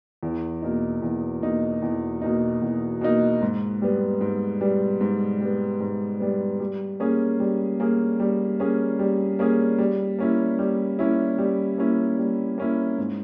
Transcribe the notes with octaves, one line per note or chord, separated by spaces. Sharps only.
E2
B2 A#3 D#4
E2
B2 A#3 D#4
E2
B2 A#3 D#4
E2
B2 A#3 D#4
G#2
G3 B3
G#2
G3 B3
G#2
G3 B3
G#2
G3 B3
G3
A#3 C#4 G#4
G3
A#3 C#4 G#4
G3
A#3 C#4 G#4
G3
A#3 C#4 G#4
G3
A#3 C#4 E4
G3
A#3 C#4 E4
G3
A#3 C#4 E4
G3
A#3 C#4 E4
G#2